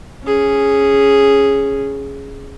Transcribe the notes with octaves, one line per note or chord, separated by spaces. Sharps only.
C#4 G#4